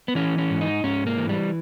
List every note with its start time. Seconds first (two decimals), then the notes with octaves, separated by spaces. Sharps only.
0.08 B3
0.15 E3 C#4
0.38 C#4
0.50 G#2
0.61 D#4
0.84 G#2 C#4
1.07 A#3
1.18 E3
1.29 G3